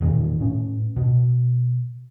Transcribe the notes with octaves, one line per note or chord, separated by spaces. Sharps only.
E1 A#2 D#3
A2 C#4
B2